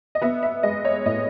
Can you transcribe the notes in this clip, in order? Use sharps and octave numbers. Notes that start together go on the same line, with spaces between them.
D#5
B3 E5
E5
G#3 D#5
C#5
A2 D#5